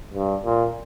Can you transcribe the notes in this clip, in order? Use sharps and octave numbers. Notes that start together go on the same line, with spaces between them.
G2
A#2